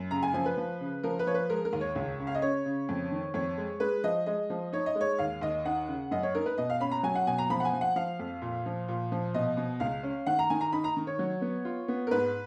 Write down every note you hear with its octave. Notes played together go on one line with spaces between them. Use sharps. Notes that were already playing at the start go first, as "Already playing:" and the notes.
Already playing: F#2
C#3 A#5
G#5
F3 G#5
B4
F3
C#3
F3 A#4
B4
F3 C#5
B4
G#3 A#4
A#4
D#2
C#5
C#2
C#3
F5
D#5
C#4 C#5
C#3
F2
D#3
F2 C#5
G#3
G#3 B4
F3 D#5
G#3 D#5
F3
D#4 C#5
D#5
G#3
C#5
D#2 F5
D#2 D#5
D#4 F#5
C#3
F#2 D#5
C#5
D#4 A#4
B4
B2 D#5
F5
C#4 B5
A#5
F#3 G#5
F#5
B2 G#5
A#5
F3 B5
F#5
G#5
F3
F#5
F3 F5
F2
A#2
F3
A#2
F3
B2 D#5
B2
C#2 F5
C#4
D#3 F#5
A#5
D#3 G#5
A#5
D#4 B5
A#5
D#3
C#5
F#3
B3
F4
B3
A#4
G#2 B4